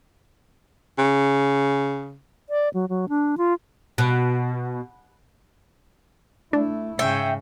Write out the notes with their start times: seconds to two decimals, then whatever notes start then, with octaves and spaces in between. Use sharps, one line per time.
0.98 C#3
2.49 D5
2.74 F#3
2.89 F#3
3.09 D4
3.38 F4
3.98 B2
6.53 A3 D4 E4
6.99 G#2 C#3 E5 G5